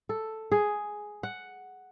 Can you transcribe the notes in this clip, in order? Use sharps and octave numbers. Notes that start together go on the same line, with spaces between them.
A4
G#4
F#5